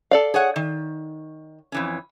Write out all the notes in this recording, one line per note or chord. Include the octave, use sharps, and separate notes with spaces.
A4 D5 F5
G#4 C#5 F#5
D#3
F2 E3 C#4